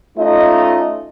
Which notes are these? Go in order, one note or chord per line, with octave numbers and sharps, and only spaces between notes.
A3 C#4 D#4 F4 D#5